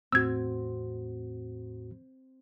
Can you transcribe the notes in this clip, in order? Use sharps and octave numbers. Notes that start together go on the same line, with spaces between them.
E2 A2 C4 F#4 E6 G#6